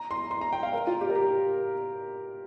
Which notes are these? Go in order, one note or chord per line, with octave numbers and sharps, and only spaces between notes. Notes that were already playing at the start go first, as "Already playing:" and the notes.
Already playing: A#5
C6
C6
A#5
G5
F5
A#4
F4
G4
A#4
G4